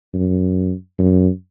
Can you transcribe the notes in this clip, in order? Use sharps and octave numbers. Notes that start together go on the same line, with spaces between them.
F#2
F#2